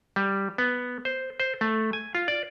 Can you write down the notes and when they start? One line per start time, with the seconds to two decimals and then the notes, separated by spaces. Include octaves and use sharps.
0.16 G3
0.58 B3
1.05 C5
1.40 C5
1.61 A3
1.93 G#5
2.15 F4
2.28 D5